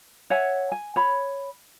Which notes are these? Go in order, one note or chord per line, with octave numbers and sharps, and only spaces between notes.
C#5 E5 F#5 G#5
G#5
C#5 B5